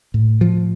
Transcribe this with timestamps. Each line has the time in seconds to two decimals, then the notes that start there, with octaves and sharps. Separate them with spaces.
0.14 A2
0.41 F3